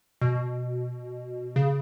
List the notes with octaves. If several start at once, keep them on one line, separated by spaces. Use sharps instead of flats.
B2
C#3